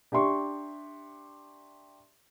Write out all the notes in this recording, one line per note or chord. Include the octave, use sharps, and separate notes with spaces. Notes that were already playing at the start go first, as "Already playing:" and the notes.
D4 G4 E5 C6 C#6